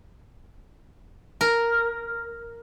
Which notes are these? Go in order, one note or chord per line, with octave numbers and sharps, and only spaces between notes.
A#4